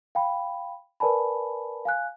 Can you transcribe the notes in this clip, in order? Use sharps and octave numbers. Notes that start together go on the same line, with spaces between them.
F5 G5 B5
A#4 B4 D5 G#5 A5 B5
F5 G#5 F#6